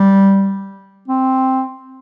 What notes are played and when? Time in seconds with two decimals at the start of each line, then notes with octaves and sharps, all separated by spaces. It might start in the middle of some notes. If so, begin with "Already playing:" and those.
Already playing: G3
1.08 C4